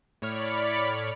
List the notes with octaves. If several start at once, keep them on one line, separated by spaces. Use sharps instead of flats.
A2 C#5 D5 B5 F6 C#7